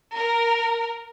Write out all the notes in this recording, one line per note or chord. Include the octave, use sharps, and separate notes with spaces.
A#4